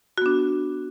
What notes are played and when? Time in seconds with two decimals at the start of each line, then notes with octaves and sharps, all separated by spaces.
0.18 F#4
0.22 B3
0.26 D4